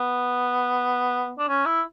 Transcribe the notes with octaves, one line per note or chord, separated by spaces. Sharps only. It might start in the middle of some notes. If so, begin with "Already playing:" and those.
Already playing: B3
D4
C#4
E4